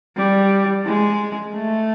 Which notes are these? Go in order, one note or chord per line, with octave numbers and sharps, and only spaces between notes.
G3
G#3
A3